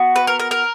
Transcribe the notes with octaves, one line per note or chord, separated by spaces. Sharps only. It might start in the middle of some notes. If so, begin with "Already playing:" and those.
Already playing: B3 F#4
B4
A#4
A#4
A#4